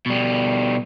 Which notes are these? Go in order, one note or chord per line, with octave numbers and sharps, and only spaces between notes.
B2 G3